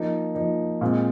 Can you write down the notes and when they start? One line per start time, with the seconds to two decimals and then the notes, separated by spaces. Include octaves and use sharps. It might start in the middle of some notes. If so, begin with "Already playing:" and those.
Already playing: F3 A#3 D#4
0.35 F3 A#3 D#4
0.81 A#2 G#3 C4